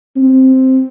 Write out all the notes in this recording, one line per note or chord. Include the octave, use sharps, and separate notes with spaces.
C4